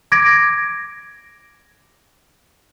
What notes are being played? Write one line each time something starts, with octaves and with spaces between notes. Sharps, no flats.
D6 G#6 A#6 D7